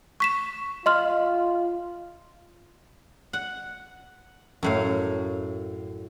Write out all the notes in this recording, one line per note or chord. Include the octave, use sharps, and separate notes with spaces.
C#6 B6 E7
F4 D#5 C6 F6
F#5
F#2 A2 F5